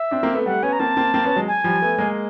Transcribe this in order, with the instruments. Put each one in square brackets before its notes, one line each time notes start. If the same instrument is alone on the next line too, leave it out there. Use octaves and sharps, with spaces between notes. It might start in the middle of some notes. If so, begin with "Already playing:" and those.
Already playing: [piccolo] E5
[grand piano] C4 D4
A#3 C4
A3 B3
[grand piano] G3 A3 [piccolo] F#5
[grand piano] B3 C#4 [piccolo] G#5
[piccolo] A#5
[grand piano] A#3 C4 [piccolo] A5
[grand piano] A#3 C4
A#3 C4
B3 C#4
F#3 G#3
[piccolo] G#5
[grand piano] F3 G3
A3 B3
G#3 A#3